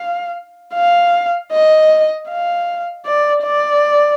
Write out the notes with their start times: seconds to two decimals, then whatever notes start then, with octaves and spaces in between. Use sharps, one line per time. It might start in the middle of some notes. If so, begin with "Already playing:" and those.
Already playing: F5
0.75 F5
1.52 D#5
2.29 F5
3.06 D5
3.43 D5